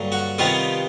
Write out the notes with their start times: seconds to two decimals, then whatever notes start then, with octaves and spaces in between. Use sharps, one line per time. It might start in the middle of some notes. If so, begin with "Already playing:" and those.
Already playing: G2 D3 F#3 A#3
0.12 F#4
0.38 C3 D#3 G3 B3 F4